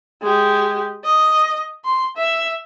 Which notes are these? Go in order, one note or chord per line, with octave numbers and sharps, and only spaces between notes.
G#3 G4
D#5
C6
E5